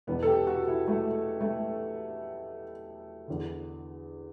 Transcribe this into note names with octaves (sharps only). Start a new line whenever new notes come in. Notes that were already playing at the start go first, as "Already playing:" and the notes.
E2 B2 B3
A4
G4
F#4
E4
A3
A3
E2 D3